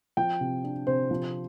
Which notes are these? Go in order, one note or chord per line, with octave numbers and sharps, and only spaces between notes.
F3 G5
C3
D4
C3 C5
F3